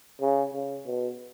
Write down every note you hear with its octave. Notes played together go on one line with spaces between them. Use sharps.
C#3
C#3
B2